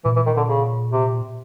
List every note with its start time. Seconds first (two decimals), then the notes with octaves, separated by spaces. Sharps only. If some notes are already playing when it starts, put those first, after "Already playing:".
0.05 A#2 E3
0.16 E3
0.26 D#3
0.37 D3
0.48 C#3
0.92 C3